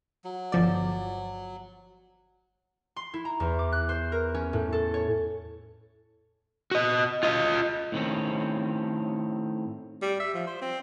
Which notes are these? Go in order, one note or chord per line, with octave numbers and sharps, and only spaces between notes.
F#3
G1 F3 D5
C6
E4
A#5
E2
D6
F#6
C5
A#4
C#4
A2
A4
C#5
F#4 D#5
F4 D#5
A2 D#3 C4 C#4
G3
E5
F3
C5
C4